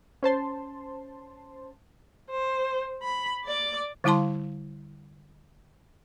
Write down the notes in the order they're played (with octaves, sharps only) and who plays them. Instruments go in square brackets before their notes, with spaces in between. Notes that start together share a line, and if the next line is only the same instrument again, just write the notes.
[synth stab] C#4 C5 A5 C6
[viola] C5
B5
D5 D6
[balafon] D3 G3 E4 F5 A5 C6